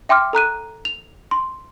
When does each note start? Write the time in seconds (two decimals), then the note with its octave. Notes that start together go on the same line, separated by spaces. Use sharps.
0.09 E5 G5 C6 D6 F6
0.33 A4 A#5 F#6 D#7
0.85 F7
1.31 C6